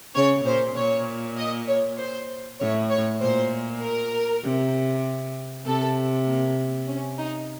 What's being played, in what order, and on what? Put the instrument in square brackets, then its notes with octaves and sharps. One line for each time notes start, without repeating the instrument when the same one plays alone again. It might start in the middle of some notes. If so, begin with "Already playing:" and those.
[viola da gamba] C#3 [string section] C#5
[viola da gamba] A#2 [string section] C5
[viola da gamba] A#2 [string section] C#5
[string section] D#5
C#5
C5
[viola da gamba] A2 [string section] C#5
[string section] C#5
[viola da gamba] A#2 [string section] C5
[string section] A#4
[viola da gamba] C3
[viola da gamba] C3 [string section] A4
[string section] A#3
C#4
D#4